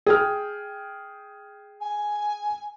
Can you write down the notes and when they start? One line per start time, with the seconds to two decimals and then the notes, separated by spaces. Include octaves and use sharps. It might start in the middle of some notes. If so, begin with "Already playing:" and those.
0.06 G#4 G5 F6
1.81 G#5